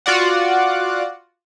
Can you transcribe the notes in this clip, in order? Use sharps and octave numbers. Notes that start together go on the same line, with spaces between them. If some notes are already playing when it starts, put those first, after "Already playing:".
F4 F#4 D5 F#5